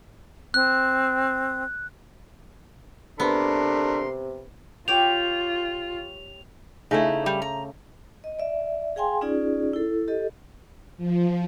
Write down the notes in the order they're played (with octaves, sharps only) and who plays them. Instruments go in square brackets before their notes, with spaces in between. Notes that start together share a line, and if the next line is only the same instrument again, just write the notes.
[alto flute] C4 [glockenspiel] F#6
[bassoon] C3 [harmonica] A3 A#4 C6 [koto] B3 [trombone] D4
[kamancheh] F4 [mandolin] G4 C#5 G5 [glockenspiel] F7
[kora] C#3 A3 [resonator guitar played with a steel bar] D#4 E4
[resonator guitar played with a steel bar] G3
A#5
[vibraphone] D#5
D5 E5
G#4 F5 G5 G#5 C6
C#4 D#4 F4 G#4 D5
E4 A4
G4 A4 D#5
[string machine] F3